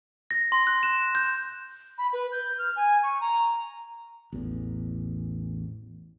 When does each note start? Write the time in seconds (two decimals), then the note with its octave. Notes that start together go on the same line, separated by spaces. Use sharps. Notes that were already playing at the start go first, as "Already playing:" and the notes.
0.31 A#6
0.52 C6
0.67 F#6
0.83 E7
1.15 G6
1.98 B5
2.13 B4
2.32 G6
2.58 F6
2.76 G#5
3.03 C#6
3.21 A#5
4.33 A1 E2